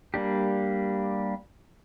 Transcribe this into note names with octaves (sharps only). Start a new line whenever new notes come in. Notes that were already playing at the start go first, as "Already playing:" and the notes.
G3 A#3 D4 G4